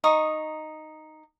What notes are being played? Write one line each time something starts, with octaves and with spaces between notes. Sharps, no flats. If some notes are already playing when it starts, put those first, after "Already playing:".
D#4 C#6 D#6